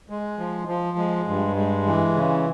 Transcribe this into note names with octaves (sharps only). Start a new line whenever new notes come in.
G#3
F3
F3
G#3
G2
G#3
E3
C#3